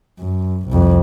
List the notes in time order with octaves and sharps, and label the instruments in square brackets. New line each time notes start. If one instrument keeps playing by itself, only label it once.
[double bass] F#2
C2 F2